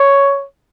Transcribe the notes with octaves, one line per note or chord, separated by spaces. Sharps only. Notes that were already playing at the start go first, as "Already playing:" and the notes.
Already playing: C#5